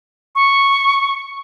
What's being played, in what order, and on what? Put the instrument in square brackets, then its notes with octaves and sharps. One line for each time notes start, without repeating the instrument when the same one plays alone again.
[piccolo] C#6